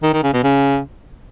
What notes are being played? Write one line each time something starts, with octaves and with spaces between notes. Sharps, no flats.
D#3
D#3
C#3
B2
C#3